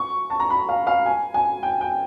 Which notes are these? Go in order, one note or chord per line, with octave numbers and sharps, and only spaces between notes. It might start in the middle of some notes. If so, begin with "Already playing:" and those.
Already playing: C#6
A5
A#5
B5
F5
F5
G#5
G#5
G5
G5